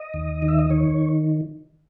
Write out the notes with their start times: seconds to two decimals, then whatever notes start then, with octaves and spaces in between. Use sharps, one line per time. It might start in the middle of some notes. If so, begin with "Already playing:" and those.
Already playing: D#5
0.14 D#2
0.42 D#3
0.48 E5
0.59 D#5
0.70 D#3 C#5